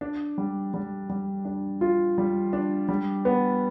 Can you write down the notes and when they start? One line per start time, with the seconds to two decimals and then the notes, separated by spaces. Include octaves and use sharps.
0.01 D4
0.38 G3
0.74 G3
1.09 G3
1.45 D4
1.81 F4
2.18 G3
2.53 D4
2.88 G3
3.25 B3